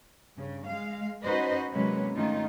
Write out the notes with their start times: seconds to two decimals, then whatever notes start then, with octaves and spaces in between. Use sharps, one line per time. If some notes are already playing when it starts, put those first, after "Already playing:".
0.36 G2 C#3
0.67 G#3 F5
1.24 C#4 D#4 F#4 B4 C5 D#5
1.73 C3 F#3 G#3 A#3 C#4 B4
2.16 G#2 D#3 A3 C#4 D#4 F4